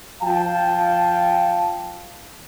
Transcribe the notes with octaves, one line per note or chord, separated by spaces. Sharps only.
F3 F5 G5 A5